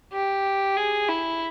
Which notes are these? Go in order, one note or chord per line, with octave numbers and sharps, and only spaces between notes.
G4
G#4
E4